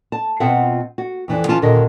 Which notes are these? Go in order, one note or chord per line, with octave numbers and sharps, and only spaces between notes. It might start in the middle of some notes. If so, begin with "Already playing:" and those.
A5
B2 C4 F4 E5 F#5
F#4
F2 E3 D4
E3 C#4 F4 A5
D#2 A#2 D3 C#4 A#4 D#5